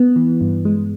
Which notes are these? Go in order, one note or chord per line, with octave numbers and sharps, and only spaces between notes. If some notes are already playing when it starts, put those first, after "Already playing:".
Already playing: B3
E3
G2
G#3